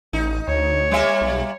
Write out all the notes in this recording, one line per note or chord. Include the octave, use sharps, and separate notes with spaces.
A1 D#4
D2 C#5
G3 A#3 E5
B1